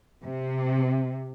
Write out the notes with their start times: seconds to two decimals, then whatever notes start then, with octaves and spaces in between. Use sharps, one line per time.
0.24 C3